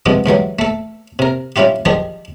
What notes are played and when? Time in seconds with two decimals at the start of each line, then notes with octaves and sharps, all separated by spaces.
0.06 G2 C3 F3 G#3 B3
0.26 G#2 E3 F#3 G3
0.59 A3 A4
1.19 C3 A#4
1.56 G3 C#4 E4 F4 G4
1.85 D#3 F3 G3 G4 G#4